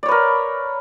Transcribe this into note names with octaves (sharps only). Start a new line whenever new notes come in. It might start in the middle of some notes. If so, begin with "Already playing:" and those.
A#4 B4 C#5 D5